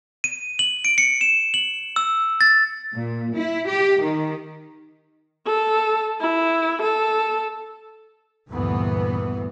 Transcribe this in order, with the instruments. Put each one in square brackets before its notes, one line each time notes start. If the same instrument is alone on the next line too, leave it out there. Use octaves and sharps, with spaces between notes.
[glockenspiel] D#7
F#7
D7
C#7
E7
F#7
E6
A6
[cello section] A#2
E4
G4
D#3
[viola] A4
E4
A4
[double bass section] D2 G2 A#2 E3 B3